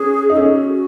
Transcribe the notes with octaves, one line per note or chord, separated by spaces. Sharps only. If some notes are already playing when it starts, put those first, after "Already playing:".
Already playing: C#4 G#4
D#4
C#4 A4
G#4
F#4